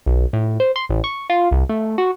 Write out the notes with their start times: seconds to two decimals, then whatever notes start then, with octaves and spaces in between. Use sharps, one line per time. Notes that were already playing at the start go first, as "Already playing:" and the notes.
0.06 B1
0.33 A2
0.60 C5
0.76 C6
0.89 A1
1.04 C#6
1.30 F4
1.51 C2
1.69 A3
1.98 F#4